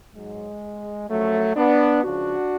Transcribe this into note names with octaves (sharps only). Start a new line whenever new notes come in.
G#2 F#3 G#3
F#2 F3 F#3 A3
B3 D4
C#2 C#3 F3 D4 F#4